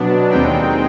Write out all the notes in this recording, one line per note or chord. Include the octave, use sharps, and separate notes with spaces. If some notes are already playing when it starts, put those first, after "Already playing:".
Already playing: B2 F#3 B3 D4
D#2 D#3 G#3 C4 D#4 G5